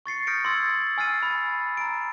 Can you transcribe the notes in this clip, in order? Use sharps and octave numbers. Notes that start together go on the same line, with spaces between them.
C#6 A6 C7 C#7
D#6 F6 G6 A#6 C#7 D7
C6 E6 G#6 A6
G#5 E6 F6 A6 C7 D#7
B5
A#5 D7